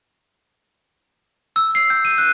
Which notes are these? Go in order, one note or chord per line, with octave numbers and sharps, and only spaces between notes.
E6
C7
G6
D#7
F#6